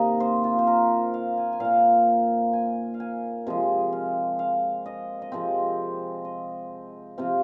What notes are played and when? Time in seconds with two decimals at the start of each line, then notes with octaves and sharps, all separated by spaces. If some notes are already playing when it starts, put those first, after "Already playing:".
Already playing: C3 D#3 A#3 D#5 F5 G#5
0.20 C5
0.44 F4
0.59 C5
0.67 A#4
1.14 F5
1.38 G#5
1.53 G#5
1.60 A#2 A#3 F5
2.53 G#5
2.94 F5
3.00 G#5
3.47 C3 F3 G#3
3.93 F5
4.39 F5
4.86 D#5
5.22 D#5
5.32 C3 F3 G#3 C4 C5
6.25 D#5
7.18 C3 F3 C4 F5